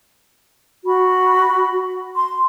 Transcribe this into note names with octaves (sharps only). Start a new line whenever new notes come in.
F#4 B5
C6